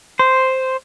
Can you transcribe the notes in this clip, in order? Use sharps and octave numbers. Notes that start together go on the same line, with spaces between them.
C5